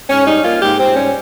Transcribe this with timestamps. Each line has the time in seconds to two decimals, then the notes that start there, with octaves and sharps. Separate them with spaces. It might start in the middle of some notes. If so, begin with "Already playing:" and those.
0.09 G#2 C#4
0.26 G3 D#4
0.44 A#3 F4
0.62 G#2 G4
0.79 G#2 C4
0.96 G3 C#4